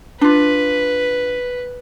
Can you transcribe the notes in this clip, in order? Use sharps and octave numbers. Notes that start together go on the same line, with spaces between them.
D4 F4 B4